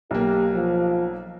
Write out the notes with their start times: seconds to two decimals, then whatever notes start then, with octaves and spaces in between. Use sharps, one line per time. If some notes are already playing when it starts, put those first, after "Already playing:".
0.11 B1 A#3 G4
0.53 F3